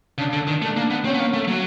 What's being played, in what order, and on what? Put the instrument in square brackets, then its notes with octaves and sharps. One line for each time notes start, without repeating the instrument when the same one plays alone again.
[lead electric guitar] C#3 [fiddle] D4
[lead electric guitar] D3
D#3
[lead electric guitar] A3 [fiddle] D4
[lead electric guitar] A#3
B3
[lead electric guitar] C4 [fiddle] C#4
[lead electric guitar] B3
A#3
A3
F#3